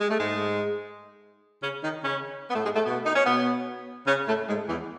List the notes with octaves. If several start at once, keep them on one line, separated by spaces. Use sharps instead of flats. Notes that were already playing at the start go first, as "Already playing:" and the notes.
G#3
A3
G#2 G#3
C#3 C#4
D#3 D#4
C#3 C#4
B3
A2 A3
G#2 G#3
A2 A3
B2 B3
D#4
C#4
B2 B3
C#3 C#4
A2 A3
G#2 G#3
E2 E3